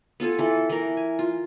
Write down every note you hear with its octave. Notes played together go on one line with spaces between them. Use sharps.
B3 F4 A4 G#5
E3 A4
E3 A#4
G#5
F4